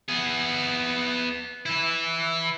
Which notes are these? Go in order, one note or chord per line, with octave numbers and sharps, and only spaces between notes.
B3 G#4
E3 E4